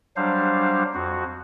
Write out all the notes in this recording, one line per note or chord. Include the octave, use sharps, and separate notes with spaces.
F#3 G3 D4 C5 F5
F2 F#4